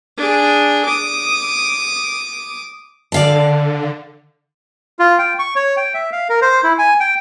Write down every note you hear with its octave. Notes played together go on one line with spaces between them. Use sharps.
D4 G#4
D6 D#6
D3 D5 F5 A5
F4
G5
C#6
C#5
G5
E5
F5
A#4
C5
E4
G#5
G5